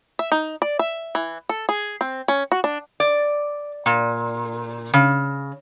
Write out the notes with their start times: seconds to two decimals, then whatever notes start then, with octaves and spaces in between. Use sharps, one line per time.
0.19 E5
0.32 D#4
0.62 D5
0.79 E5
1.15 E3
1.49 A4
1.69 G#4
2.01 C4
2.28 C#4
2.52 F#4
2.64 D4
3.00 D5
3.86 A#2
4.94 C#3